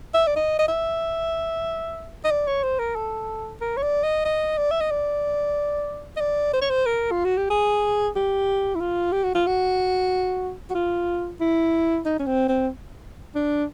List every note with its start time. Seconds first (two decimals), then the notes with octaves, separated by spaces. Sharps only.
0.14 E5
0.27 D5
0.36 D#5
0.59 D#5
0.68 E5
2.24 D#5
2.31 D5
2.47 C#5
2.63 C5
2.79 A#4
2.96 A4
3.61 A#4
3.77 C#5
3.82 D5
4.03 D#5
4.25 D#5
4.57 D5
4.71 E5
4.80 D#5
4.91 D5
6.17 D#5
6.20 D5
6.54 C5
6.61 C#5
6.70 C5
6.86 A#4
7.11 F4
7.25 F#4
7.37 G4
7.50 G#4
8.16 G4
8.75 E4
8.80 F4
9.12 G4
9.24 F#4
9.35 F4
9.47 F#4
10.70 F#4
10.75 F4
11.41 E4
12.05 D#4
12.19 C#4
12.26 C4
12.49 C4
13.35 D4